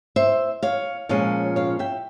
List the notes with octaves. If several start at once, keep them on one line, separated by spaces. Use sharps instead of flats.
C5 E5
C#5 F5
A#2 F3 G#3 C#4 C#5 F5
C#5 F5
E5 G5